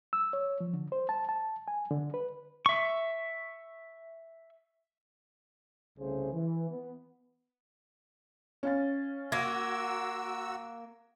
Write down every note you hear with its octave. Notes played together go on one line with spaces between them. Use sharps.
E6
C#5
F3
D3
C5
A5
A5
G#5
D3
B4
E5 C#6
C2 C#3 A3 G#4 C5
E3
B3
C#4 F5 A6
A#3 F#4 E6 G#6 A#6